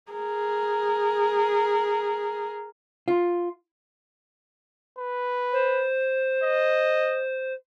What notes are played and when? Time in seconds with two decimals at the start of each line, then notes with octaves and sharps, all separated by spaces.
0.12 G#4 A#4
3.08 F4
4.99 B4
5.52 C5
6.44 D#5